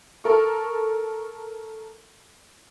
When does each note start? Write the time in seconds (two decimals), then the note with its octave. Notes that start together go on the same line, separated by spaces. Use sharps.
0.24 A4 A#4 C#6